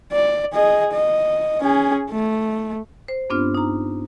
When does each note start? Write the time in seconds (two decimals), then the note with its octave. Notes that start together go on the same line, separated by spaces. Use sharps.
0.13 D5
0.53 G#4 D#5
0.92 D#5
1.61 C#4 G#4
2.10 A3
3.08 C5
3.30 G2 B3 C4 D4 F4 F6
3.55 D#4 A#5